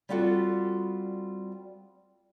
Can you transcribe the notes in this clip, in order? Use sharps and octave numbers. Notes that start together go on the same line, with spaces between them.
G3 C4 F4 F#4 A4